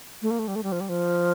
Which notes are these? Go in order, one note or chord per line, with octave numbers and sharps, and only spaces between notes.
A3
A#3
A3
G3
A3
G3
F3
G3
F3